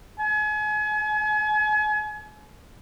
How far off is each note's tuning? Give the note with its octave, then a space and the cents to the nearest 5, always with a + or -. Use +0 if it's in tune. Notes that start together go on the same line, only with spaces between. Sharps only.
G#5 +35